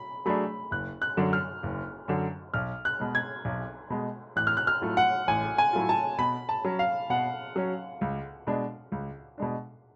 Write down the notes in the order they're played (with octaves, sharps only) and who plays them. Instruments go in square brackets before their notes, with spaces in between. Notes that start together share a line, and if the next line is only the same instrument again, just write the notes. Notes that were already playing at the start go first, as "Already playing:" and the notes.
Already playing: [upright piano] B5
[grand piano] F#3 A3 D4 G#4 [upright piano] B5
[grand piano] F#1 [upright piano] F#6
[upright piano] F#6
[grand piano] F#2 D3 F#3
[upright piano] F6
[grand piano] F#1
F#2 D3 F#3
[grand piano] B1 [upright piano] F6
[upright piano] F#6
[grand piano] B2 G#3
[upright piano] G#6
[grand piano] B1
B2 G#3
[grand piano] A1 [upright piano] F#6
[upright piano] F6
F#6
F6
[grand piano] A2 F#3 A3 F4
[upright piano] F#5
[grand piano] A1 [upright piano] G#5
[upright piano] G#5
[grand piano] A2 F#3 A3 F4
[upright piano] A5
[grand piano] B2 [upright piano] B5
[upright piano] A5
[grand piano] F#3 C#4
[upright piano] F5
[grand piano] B2 [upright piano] F#5
[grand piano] F#3 C#4
C#2
B2 G#3 D4
C#2
B2 G#3 D4